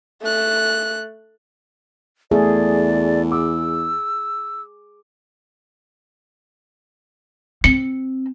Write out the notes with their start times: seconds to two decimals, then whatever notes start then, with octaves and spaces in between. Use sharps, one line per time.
0.22 A3 F#6
2.31 E2 A3 G#4 D5
3.32 D6 E6
7.64 C4 C#7